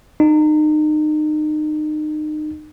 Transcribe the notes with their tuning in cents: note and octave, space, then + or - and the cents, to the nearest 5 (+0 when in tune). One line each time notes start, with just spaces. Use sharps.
D#4 -30